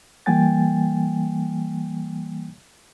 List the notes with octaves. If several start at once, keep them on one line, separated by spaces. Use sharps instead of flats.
E3 G3 A#3 G5 G#5 A6